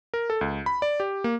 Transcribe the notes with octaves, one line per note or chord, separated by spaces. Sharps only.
A#4
A4
C#2
B5
D5
G4
A#3